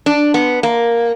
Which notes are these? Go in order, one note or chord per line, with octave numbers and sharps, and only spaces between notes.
D4
B3
A#3